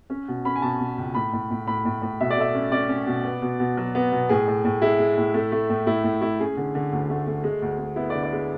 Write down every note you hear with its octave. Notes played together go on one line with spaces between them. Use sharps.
C#4
B2
C#4 B5
G#5
B2 A5
B2
C#2
A2 B5
A2
A2
A2 B5
A2
A2
B2 E5
D5
A3 E5
C#4
C#4 D5
C#4
B2
B3
B2
B2
F#3
B3
B2
A2 G#4
A2
A2
G#3 E4
G#3
A2
A3
A3
A2
A2 E4
A2
A3 E4
C#4 G#4
D3
D3
D2
A3
A3
G#3
D2
G#3
B3 E4
D5
D3
D5
G#3